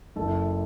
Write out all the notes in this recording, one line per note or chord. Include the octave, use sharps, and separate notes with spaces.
F#1 E4 A4